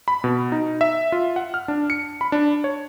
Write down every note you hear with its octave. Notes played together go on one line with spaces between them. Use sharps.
B5
B2
D#4
E5
F4
F#5
F6
D4
C#7
B5
D4
C#5